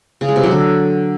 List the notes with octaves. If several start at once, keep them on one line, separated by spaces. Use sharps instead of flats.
C#3
G#3
C3
F#3
D3